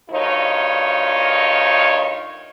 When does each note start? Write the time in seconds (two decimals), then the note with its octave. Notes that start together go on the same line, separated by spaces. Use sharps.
0.11 D2 G2 D#3 D#4 F4 C#5